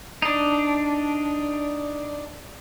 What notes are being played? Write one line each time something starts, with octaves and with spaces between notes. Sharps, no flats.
D4 D#4